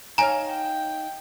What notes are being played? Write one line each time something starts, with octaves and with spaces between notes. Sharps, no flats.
D#4 C#5 F5 G#5 A#5
G5